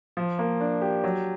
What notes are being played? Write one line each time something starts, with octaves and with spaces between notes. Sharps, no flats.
F3
A#3
D4
G4
F#3